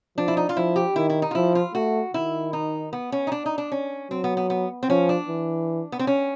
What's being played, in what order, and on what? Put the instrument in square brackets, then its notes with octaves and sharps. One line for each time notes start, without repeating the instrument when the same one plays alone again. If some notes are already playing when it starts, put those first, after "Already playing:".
[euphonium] F3 [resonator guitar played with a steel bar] D4
[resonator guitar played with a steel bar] E4
D#4
F4
[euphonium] F3 [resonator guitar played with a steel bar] E4
[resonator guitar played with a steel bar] G4
[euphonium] D#3 [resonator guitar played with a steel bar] E4
[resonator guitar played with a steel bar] E4
D#4
F4
[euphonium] F3 [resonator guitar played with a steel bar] E4
[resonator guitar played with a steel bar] F4
[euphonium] A3 [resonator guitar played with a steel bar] F#4
[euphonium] D#3 [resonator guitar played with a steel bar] E4
[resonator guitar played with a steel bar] D#4
B3
C#4
D#4
D4
D#4
D4
C#4
[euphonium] F#3 [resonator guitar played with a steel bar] C4
[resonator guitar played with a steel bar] B3
B3
B3
C4
[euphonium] F3 [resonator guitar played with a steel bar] C#4
[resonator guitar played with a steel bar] D4
[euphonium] E3
[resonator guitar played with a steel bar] B3
C4
C#4